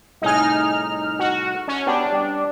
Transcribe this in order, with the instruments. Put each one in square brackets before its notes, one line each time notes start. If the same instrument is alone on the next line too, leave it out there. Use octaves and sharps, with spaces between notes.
[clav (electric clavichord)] C2 A2 G#4 [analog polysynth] D#4 F6
[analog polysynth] F#4
C#4
[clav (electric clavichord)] B3 G4 A5 [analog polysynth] D4
[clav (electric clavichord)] G3